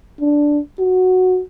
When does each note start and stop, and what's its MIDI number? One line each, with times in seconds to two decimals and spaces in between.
0.21 0.59 62
0.79 1.41 66